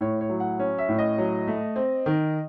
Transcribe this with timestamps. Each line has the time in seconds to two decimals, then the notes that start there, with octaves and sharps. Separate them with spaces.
0.01 A2 C#5
0.21 C#5
0.30 F#3
0.40 F#5
0.59 C#4
0.78 E5
0.89 A2
0.98 D#5
1.18 F#3
1.47 A3
1.76 C4
2.06 D#3